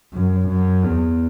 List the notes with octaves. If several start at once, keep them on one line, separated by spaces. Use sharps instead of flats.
F#2
F#2
E2